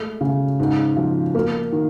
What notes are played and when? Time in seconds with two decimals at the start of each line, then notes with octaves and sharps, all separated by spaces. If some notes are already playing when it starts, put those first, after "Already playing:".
Already playing: G#3 A3
0.21 C#3
0.60 G#2
0.96 F3
1.35 A#3
1.72 D#3